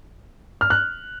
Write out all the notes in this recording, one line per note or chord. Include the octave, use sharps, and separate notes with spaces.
F6
F#6